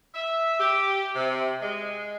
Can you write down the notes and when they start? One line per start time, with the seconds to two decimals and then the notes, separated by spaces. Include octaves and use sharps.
0.15 E5
0.60 G4
1.15 C3
1.61 G#3